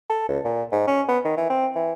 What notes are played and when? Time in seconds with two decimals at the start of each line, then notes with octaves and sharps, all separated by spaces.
0.10 A4
0.29 C#2
0.45 A#2
0.72 G#2
0.87 C#4
1.08 B3
1.25 D#3
1.37 E3
1.50 C4
1.76 E3